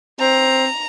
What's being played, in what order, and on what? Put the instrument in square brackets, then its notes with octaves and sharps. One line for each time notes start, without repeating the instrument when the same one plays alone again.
[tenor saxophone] C4 [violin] A#5